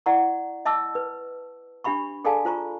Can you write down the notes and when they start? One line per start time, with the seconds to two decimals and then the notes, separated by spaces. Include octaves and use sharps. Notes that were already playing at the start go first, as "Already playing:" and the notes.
0.06 E4 D5 F#5 A#5 C#6
0.65 D#5 E5 A5 D6 E6
0.95 B4
1.84 D4 G4 E5 B5 C#6
2.25 G#4 A4 D5 F5 G#5 A5
2.45 F4 C5 A#5 C#6